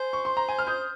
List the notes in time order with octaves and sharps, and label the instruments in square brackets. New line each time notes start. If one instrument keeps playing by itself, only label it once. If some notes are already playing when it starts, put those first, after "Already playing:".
Already playing: [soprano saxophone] C5 [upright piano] G#5
[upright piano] C#6
C6
A#5
G#5
F6
D#6 G6